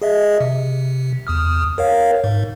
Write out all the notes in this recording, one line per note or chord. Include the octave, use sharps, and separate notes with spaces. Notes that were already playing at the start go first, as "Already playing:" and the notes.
G#4 D#5 E5
C3
E2 D#6 F6
A#4 C#5 F5
G#2